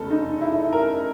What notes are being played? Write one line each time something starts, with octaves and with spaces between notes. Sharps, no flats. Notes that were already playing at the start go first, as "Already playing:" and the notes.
Already playing: F1 E2 C#3 A4
D#4
E4
A#4